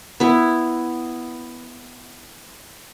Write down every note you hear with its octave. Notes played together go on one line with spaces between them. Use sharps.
B3 E4